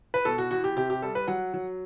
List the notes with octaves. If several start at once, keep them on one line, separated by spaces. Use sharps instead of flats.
B4
B2 A4
F#4
E2 F#4
G4
C3 G4
G4
G3 A4
B4
F#3 F#5
F#3